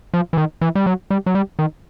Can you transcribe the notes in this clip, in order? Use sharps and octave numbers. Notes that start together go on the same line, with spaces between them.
F3
E3
D#3
E3
G3
F#3
G3
F#3
G3
D#3